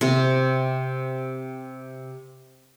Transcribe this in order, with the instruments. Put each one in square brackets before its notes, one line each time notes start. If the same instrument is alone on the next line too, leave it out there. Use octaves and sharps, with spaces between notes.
[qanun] C3 C4